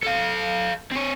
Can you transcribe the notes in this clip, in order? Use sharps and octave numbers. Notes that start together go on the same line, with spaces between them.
A4 F5
C4 C#5